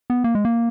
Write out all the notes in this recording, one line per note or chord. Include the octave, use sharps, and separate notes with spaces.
B3
A#3
G#3
A#3